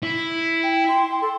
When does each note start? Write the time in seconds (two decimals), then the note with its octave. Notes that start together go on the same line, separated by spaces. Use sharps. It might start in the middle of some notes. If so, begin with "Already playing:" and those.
0.03 E4
0.63 G5
0.88 C6
1.22 A4 C6